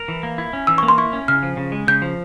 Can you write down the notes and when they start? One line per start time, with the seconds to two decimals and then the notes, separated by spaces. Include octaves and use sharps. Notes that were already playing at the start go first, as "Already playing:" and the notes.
Already playing: A#4
0.08 E3
0.23 A#3
0.38 E4
0.53 C#4
0.67 E3 E6
0.78 A#3 C#6
0.88 C6
0.98 E4 C#6
1.13 C#4
1.28 C#3 F6
1.43 F3
1.57 C#3
1.72 G#3
1.87 C#3 G6
2.02 F3